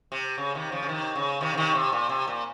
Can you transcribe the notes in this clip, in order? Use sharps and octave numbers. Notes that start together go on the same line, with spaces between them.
C3
C#3
C3 D#3
C#3 F3
C#3
C3 D#3
C#3
C3 D#3
C#3
C3 D#3
C3
A#2
C3
A#2